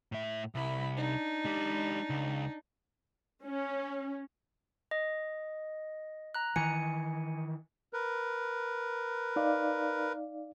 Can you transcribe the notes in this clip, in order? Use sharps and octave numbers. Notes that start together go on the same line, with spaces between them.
A2 E5
C2 E4 B5
D4 D#4
G#3 G4
C#2
C#4
D#5
A#5 F#6
D#3 E3 G#5 C#7
A#4 B4
D#4 D5 F5